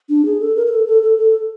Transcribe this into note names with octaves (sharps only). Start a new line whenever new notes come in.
D4
G#4
A4
A#4
A#4
A4
A4
A4
A4